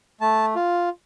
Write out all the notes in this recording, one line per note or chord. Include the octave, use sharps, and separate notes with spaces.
A3 A5
F4